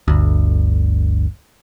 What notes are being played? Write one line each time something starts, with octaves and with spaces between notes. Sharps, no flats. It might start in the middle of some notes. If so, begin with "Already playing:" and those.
G1 D2